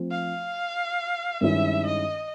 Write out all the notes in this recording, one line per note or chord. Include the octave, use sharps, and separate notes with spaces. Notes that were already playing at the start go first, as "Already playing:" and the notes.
Already playing: F3 A3 C4
F5
G2 D#3 G#3 C#4 E4 E5
D#5